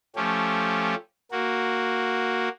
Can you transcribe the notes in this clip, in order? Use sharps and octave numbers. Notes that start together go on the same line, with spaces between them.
F3 A3 C#4 G4
A#3 F#4